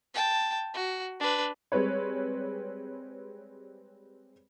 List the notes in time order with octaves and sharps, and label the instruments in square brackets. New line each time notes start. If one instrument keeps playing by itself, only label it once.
[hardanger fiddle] G5 A5
F#4
D4 B4
[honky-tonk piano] G3 G#3 C4 B4 C#5